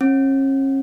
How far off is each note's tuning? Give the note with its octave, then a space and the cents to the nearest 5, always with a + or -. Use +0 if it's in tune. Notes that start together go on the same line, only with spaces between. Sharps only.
C#4 -40